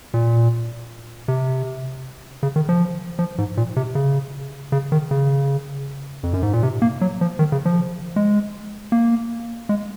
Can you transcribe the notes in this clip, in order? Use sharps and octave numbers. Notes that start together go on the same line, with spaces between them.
A#2
C3
C#3
D#3
F3
F3
G#2
A#2
C3
C#3
C#3
D#3
C#3
F2
F#2
G#2
A#2
C3
A#3
F#3
F3
D#3
C#3
F3
G#3
A#3
G#3